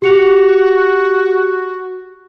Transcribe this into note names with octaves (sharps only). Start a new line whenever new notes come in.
F#4 G4 C#7 F7